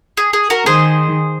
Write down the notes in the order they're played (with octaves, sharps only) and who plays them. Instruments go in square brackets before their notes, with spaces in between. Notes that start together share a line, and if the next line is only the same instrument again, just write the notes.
[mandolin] G#4
G#4
F#4 A#4
[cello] D#3 [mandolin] G#4 C5